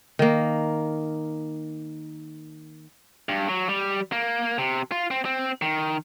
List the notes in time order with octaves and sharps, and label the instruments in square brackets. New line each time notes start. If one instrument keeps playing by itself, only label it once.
[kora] D#3 A#3
[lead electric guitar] G2
F#3
G3
A#3
C3
F4
C4
C4
D#3